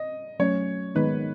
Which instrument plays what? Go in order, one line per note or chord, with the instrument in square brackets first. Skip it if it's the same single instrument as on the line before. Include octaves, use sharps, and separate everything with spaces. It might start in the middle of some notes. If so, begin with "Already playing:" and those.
Already playing: [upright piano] D#5
[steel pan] F#3 A3 C#4 [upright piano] C#5
[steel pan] D#3 G#3 B3 D#4 [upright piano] B4